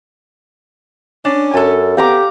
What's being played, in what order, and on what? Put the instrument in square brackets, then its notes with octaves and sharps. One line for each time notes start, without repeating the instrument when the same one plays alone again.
[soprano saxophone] C#4 [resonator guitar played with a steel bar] D4
[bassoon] F#2 [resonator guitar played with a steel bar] A4 G#5
[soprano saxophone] B3 [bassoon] G4 [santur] F5 A#5 D6